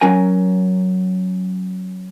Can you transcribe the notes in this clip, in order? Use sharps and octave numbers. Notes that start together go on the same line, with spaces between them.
F#3 C#4 A#4 G#5